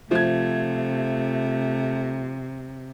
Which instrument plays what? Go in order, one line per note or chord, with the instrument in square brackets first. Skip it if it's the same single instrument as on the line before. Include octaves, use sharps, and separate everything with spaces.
[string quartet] C3 [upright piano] F3 G#6 [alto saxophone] A3